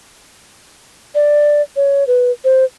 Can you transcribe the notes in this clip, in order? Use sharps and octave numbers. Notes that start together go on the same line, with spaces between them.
D5
C#5
B4
C5